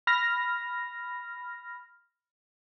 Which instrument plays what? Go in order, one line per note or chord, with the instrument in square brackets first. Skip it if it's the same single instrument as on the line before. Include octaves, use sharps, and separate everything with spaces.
[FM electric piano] B5 F6 A#6